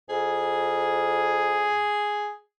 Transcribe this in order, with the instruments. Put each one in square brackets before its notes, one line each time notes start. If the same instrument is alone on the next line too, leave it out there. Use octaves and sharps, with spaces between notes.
[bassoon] F2 [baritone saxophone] G#4